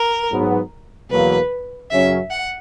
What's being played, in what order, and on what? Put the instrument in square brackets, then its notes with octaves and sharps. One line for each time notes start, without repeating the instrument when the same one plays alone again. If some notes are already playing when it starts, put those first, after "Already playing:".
Already playing: [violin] A#4
[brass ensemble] G#2 F#3 B3
[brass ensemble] E2 B2 F#3 A#3 [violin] B4
[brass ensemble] F#2 C#3 F#3 C#4 [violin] E5
[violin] F#5